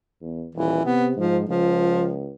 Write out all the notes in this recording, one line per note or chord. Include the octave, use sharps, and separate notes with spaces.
E2
D#1 E3
C3 B3
G#2 F3
C#2 F3